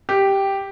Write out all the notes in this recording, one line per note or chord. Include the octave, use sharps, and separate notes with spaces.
G4